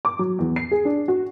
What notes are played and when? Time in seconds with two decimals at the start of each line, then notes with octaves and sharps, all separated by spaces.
0.05 D6
0.19 F#3
0.39 E2
0.56 C7
0.71 G#4
0.85 D4
1.08 F#4